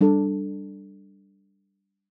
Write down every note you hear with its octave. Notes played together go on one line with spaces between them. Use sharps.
G3 D4 A4